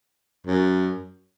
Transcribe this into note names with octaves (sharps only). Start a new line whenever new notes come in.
F#2